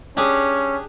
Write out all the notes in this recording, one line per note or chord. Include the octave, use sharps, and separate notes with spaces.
C#4 D4 G4 G#4